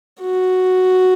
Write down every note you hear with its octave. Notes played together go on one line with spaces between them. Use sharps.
F#4